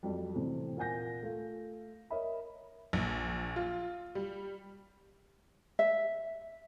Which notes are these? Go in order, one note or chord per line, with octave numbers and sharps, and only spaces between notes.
F2 F#3 G3
A2 C3 E3 A3 C4
A#2 A#3 F#5 G#5 G6 A#6
A3 F4
A#4 C#5 D#5 E5 B5
A#1
F4
G3
E5